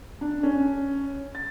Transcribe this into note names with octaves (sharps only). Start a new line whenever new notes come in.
D4
C#4
A6